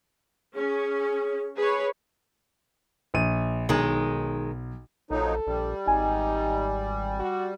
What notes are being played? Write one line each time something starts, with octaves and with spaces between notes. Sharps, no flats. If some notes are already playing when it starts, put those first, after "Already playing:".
C#4 G#4
G#4 B4 C#5
A#1 D#7
B1 D#3 G#3
A#1 F3 F#3 D#4 A4
A#1 G3
G#1 D#4 G#5
F#4